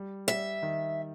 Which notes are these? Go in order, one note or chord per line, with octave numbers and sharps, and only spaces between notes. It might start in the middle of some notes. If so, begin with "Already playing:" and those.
Already playing: G3
G3 E5
D#3